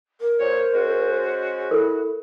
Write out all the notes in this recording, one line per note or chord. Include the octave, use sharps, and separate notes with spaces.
A#4
A#2 C5 C#5
G#3 C#4 F#4
E4 A4 A#4